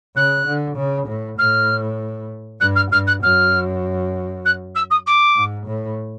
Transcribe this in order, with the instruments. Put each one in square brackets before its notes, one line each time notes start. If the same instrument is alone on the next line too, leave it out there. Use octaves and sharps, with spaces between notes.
[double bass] C#3 [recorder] F#6
[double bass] D3
C#3
A2
[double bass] A2 [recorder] F6
[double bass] G2 [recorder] F#6
[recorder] F6
[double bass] G2 [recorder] F6
[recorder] F#6
[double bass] F#2 [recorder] F6
[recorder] F#6
E6
D#6
D6
[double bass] G#2
A2